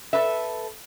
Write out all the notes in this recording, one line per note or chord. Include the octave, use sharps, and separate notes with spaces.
A4 B4 E5